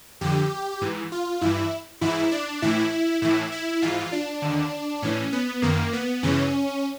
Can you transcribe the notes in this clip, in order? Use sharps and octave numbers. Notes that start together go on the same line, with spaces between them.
F2 D3 G4
G#2 E3
F4
G2 E3 E4
G#2 E3 E4
D4
A2 E3 E4
A2 E3 E4
E4
G#2 E3 F4
D4
D#2 D3
A2 E3 C#4
B3
F#2 D#3 A#3
B3
F#2 C#3 E3 C#4